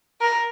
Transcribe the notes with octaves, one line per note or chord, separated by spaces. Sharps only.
A#4